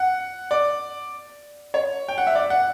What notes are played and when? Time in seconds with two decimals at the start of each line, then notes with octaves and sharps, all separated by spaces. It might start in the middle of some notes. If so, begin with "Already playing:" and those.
Already playing: F#5
0.51 D5
1.74 C#5
2.08 G5
2.18 F#5
2.27 E5
2.35 D5
2.50 F#5